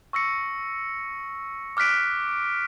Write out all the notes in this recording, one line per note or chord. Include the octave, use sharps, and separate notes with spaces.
C#6 E6 A#6 C#7
D6 F6 F#6 B6 D7